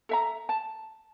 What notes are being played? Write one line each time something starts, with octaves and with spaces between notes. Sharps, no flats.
A4 E5 A#5
A5